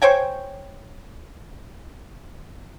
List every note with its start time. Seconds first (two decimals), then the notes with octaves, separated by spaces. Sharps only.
0.02 C5 C#5 G5 G#5